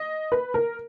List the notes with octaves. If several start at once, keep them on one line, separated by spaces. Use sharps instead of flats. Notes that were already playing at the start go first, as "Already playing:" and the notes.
Already playing: D#5
B4
A#4